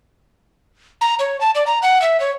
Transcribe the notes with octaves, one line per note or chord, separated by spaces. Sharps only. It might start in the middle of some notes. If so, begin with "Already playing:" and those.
A#5
C#5
A5
D5
A#5
F#5
E5
C#5